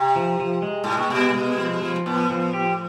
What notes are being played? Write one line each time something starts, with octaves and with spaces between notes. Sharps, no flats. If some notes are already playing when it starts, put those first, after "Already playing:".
Already playing: C3
F3
F3
G#3
A2 G#3
A#2
B2 B3
G#3
F3
F3
A2 B3
F3
G4